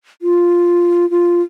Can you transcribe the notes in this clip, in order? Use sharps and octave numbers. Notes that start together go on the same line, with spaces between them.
F4
F4